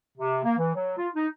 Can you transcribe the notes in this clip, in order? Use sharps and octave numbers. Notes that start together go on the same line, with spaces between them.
C3
A#3
E3
F#3
F4
D#4